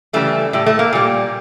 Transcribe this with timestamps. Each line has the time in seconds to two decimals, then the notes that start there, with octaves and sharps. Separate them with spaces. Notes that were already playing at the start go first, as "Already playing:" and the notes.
0.13 C#3 E3 G3 A3
0.53 A2 G3
0.66 A3
0.79 A#3
0.93 A#2 G3